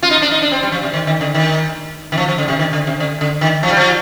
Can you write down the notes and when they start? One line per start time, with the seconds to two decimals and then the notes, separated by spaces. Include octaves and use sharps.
0.03 F4
0.10 D#4
0.22 D4
0.32 D#4
0.42 D4
0.52 C4
0.63 G3
0.72 F3
0.83 C3
0.94 D#3
1.07 D#3
1.21 D3
1.35 D#3
2.12 D#3
2.17 F3
2.28 F3
2.38 D3
2.48 C3
2.59 D#3
2.73 D3
2.87 C3
3.00 D3
3.21 D3
3.41 D#3
3.63 F3
3.70 G3
3.77 F3